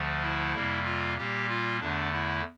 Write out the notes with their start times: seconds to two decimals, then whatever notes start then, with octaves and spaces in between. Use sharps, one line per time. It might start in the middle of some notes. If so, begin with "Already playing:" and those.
Already playing: D2 D3 F3 A3
0.23 E4
0.54 F2 C3 G3 A#3
0.85 F4
1.17 A#2 G3 A#3 G4
1.49 F4
1.80 E2 D3 A3 D4
2.13 E4